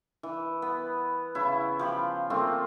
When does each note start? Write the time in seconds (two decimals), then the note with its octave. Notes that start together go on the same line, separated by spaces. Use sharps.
0.23 E3
0.62 B3
1.35 C#3 E4
1.79 F3 G4 B5
2.30 A3 A#3 C4 F4